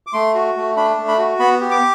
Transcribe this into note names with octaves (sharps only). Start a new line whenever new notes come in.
D6
A3 C6
F#4
A3
D4 B5
A3
B5
F#4
B3 B5
G4
D6